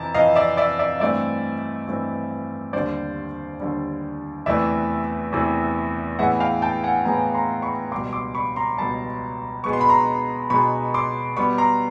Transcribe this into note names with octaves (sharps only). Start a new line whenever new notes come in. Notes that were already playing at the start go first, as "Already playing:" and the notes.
Already playing: F2 C3 E3 A5 A#5
F2 C3 E3 D#5 F5
D5 E5
D5 E5
D5 E5
G2 E3 A3 C4 D5 E5
G2 E3 A3 C4
D#2 D3 G3 C5 D5
D#2 D3 G3
E2 C3 E3 A3 D5 E5
E2 C3 E3 A3
A2 E3 G#3 B3 E5 F#5
F5 G5
G5 A5
F#5 G#5
A2 E3 G#3 B3 G#5 A#5
A#5 C6
B5 C#6
C#2 B2 G3 C6 D6
C6 D6
B5 C#6
A#5 C6
C#2 B2 G3 A5 B5
B2 G#3 B3 C#6
C6
B5
A#5 C6
B2 G#3 B3 B5 C#6
C6 D6
B2 G3 B3 B5 C#6
A#5 C6